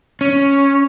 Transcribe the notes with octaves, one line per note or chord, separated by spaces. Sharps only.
C#4